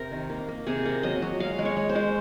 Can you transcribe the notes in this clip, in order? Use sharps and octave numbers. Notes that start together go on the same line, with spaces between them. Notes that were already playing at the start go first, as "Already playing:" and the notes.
Already playing: C3 A#4
D#3
A#3
A#3
C3 G#4
A#3
F#3 D#5
F#3
G#3 F5
G#3
C#5
G#3
C5
G#3